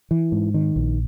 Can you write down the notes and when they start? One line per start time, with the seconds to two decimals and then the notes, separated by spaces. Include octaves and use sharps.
0.11 E3
0.32 G#2
0.54 D#3
0.76 A#1